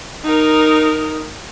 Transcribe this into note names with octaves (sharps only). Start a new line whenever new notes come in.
D#4 A#4